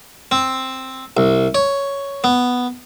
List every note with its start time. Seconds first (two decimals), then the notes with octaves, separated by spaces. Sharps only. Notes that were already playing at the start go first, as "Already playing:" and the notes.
0.31 C4
1.17 C2
1.55 C#5
2.24 B3